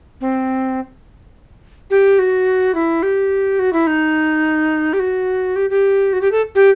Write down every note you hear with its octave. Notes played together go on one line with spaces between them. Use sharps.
C4
G4
F#4
E4
G4
F#4
E4
D#4
G4
F#4
G4
G4
F#4
G4
A4
G4